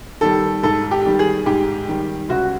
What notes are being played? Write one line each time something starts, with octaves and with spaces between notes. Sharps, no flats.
D#3 G3 A4
G#2 A4
G4
D#3 G3
G#4
G#2 G4
D#3 G3
C#2 F#4